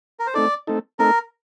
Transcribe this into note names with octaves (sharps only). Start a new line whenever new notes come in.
A#4
C5
A3 C4 D#4 A4 D5
A3 C4 D#4 A4
A3 C4 D#4 A4 A#4